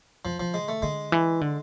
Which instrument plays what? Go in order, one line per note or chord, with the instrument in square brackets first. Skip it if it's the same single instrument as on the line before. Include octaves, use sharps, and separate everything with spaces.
[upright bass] F2 [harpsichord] F3
[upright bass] D3 [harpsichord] F3
[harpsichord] G#3
A3
[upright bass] D3 [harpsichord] G#3
[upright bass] E3
D3